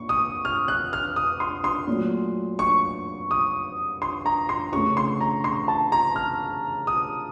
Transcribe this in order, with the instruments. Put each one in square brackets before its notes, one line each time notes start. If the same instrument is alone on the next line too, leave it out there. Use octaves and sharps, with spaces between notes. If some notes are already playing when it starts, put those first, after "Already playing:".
Already playing: [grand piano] A#2 C#6
D#6
F6
F#6
F6
D#6
C6
C6
A#2 F#3 A3
C#6
D#6
C6
A#5
C6
C#3 A3 C#6
C6
A#5
C6
A5
A#5
F6
D#6